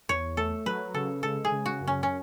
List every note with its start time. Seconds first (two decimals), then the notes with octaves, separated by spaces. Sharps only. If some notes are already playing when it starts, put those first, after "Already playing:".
0.09 E2 C#5
0.37 A3 A4
0.66 F#3 B4
0.94 C#3 A4
1.23 G#3 A4
1.45 G#4
1.52 C#3
1.66 F#4
1.80 F#2
1.87 C#4
2.03 C#4